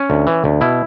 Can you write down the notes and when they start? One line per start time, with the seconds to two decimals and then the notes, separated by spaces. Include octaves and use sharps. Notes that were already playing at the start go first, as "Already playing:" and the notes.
Already playing: C#4
0.10 D2
0.27 E3
0.44 D2
0.61 B2 E4